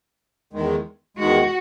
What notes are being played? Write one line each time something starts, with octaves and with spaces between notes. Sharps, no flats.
E2 D#3 G#3
E2 D#3 G#3 F#4